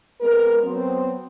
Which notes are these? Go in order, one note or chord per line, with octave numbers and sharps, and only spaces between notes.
G#3 B3 C4 A#4
F#3 B3 C4